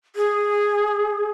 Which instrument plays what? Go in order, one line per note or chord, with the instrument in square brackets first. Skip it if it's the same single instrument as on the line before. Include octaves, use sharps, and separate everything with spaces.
[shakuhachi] G#4